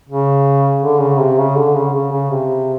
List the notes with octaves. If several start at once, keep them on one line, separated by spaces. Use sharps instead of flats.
C#3
D3
C#3
C3
C#3
D3
C#3
C#3
C#3
C3